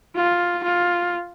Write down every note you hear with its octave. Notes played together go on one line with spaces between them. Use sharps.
F4
F4